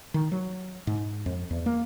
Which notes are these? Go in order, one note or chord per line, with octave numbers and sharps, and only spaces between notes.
D#3
F#3
G#2
F2
E2
A#3